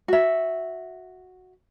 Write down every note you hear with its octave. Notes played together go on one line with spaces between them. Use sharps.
F#4 E5